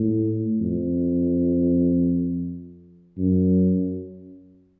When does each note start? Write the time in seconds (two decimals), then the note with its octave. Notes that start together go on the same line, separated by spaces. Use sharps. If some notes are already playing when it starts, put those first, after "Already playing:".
Already playing: A2
0.60 F2
3.18 F#2